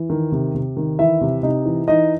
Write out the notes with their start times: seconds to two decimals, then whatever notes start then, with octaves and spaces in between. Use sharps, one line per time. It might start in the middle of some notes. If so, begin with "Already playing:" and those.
Already playing: E3
0.10 D#3
0.32 C3
0.54 C3
0.77 D#3
0.99 E3 E4 E5
1.21 C3
1.43 C3 D#4 D#5
1.65 E3
1.88 E3 D#4 D#5